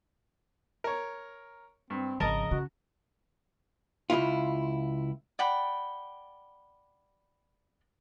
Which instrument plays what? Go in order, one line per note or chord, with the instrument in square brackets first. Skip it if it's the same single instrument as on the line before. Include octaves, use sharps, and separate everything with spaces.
[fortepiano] A#4 C#5
[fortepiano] G2 [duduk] C4
[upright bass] G#1 F3 [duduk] C#3 [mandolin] A#4 D#5 A#5 [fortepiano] A5
[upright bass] C#3 [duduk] F#4
[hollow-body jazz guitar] C#2 F#2 E4 F4
[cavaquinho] D5 F#5 G5 B5